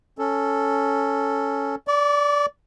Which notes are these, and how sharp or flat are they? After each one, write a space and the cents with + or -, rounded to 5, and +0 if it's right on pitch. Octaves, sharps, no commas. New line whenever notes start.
C#4 +0 A4 +0
D5 -15 C#6 +45